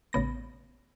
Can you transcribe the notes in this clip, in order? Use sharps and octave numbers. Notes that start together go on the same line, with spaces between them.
A1 C#3 B3 A#6